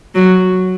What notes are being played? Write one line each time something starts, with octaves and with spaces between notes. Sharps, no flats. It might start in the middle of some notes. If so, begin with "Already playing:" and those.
F#3